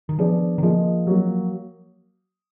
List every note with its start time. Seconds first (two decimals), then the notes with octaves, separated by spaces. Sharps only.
0.09 D#3
0.18 F3 B3 D4 G#4 D5
0.58 D#3
0.63 F3 A#3 F4 G#4 D#5
1.07 F#3 A#3